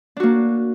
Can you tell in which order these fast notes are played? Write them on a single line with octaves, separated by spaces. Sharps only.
D4 F#4 A#3